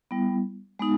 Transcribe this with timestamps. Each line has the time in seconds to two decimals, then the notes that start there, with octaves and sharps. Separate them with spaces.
0.11 G3 B3 E4
0.79 G#3 B3 D#4